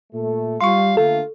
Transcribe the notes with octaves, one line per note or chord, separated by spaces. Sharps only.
A#2 A3 A4
G3 F4 F5 C6 C#6
D3 A3 A#3 F4 A4